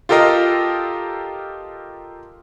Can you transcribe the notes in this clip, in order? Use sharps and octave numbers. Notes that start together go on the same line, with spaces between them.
F4 G4 A4 A#4 D#5 F5